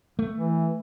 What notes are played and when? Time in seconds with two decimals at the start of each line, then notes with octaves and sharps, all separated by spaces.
0.19 A3
0.35 E3